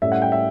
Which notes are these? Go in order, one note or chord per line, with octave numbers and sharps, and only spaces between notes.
A2 G3 C#4 E5
F#5
G5
E5